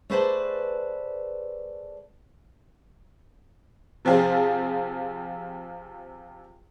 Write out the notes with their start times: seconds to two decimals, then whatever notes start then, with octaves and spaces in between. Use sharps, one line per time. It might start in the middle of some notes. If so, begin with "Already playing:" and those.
0.10 A3 G#4 B4 C5 D5 A5
4.05 C3 F3 C4 F4 G#4